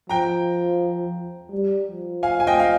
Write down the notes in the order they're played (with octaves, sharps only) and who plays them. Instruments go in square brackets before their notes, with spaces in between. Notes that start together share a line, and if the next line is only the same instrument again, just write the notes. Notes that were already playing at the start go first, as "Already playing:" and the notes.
[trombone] F3 [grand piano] G5 A#5
[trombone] G3
F3
[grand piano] F5 G#5
G#5
D#5 G5
F5